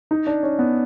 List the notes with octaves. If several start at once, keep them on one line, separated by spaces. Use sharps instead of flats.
D#4
D4
C#4
B3